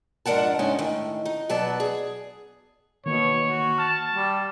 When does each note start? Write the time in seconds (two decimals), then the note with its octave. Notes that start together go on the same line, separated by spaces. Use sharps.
0.26 F2 G#2 D4 A#4 F#5 A5
0.59 G#2 C#3 C#4 D#4 G#5
0.79 A2 D#3
1.25 D#4
1.49 B2 F#3 B3 D5 A5
1.80 G#4
3.06 B2 D#3 A#3 C#5
3.47 F#4
3.78 A5 F6
4.14 G3